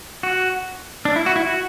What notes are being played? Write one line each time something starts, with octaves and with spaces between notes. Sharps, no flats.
F#4
D4
E4
F#4
E4
F#4